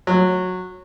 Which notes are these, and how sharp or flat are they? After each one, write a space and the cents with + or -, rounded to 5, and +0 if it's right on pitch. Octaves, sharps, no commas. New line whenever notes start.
F#3 -15